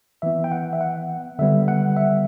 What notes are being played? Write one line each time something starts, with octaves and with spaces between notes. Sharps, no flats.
E3 B3 E5
G5
F#5
E5
F#5
D3 G3 B3 E5
F#5
E5